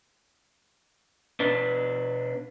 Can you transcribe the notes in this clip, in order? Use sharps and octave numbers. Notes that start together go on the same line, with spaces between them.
B2 D4 B4